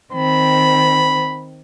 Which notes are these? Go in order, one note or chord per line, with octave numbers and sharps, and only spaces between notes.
D#3 C4 B5